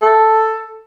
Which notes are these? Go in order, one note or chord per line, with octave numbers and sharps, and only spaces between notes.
A4